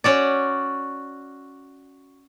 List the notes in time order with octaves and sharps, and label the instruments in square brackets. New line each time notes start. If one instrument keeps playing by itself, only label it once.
[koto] C#4 F#4 D5